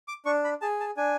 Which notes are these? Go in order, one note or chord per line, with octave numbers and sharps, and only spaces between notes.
D6
D4 C#6
B5
G#4 A5
A5
D4 G#5